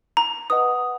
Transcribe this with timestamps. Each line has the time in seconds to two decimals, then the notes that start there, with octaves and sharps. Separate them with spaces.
0.17 A#5
0.50 B4 D#5 F#5 D#6